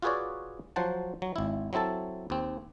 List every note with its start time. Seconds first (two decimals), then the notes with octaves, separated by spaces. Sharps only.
0.02 F4 F#4 G#4 B4 C#5 D5
0.76 F3 F#3 C5 F#5 A5
1.22 F#3
1.36 G#1 E4
1.73 F#3 C4 E4 A4 A5
2.30 D#2 C4